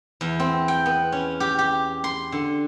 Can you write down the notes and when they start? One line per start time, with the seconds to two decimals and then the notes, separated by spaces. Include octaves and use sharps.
0.21 E2
0.40 C4
0.68 G5
0.86 B3
1.12 C#4
1.40 G4
1.59 G4
2.04 C6
2.32 D3